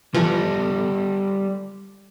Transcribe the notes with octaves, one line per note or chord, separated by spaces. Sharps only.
E3 F3 G3 A4